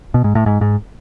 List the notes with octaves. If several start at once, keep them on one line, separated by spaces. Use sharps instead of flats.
B2
G#2
A2
G#2
G#2